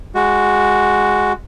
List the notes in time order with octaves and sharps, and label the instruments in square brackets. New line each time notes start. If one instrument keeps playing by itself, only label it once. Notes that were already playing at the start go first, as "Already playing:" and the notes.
[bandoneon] G#3 F#4